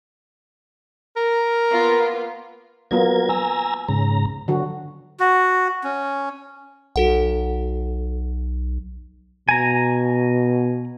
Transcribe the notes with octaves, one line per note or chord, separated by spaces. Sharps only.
A#4
A#3 B3 F4
F#3 A#3 B3 F4 A#4 G#6
G#5 A#5 E6
G#2 C#3 A#5
D3 F#3 F#4
F#4
C#4
B1 F#4 A4 F#5
B2 G#5 A#5